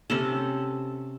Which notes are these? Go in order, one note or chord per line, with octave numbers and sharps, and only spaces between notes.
C3 C#4 A4